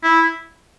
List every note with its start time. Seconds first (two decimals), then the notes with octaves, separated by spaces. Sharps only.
0.03 E4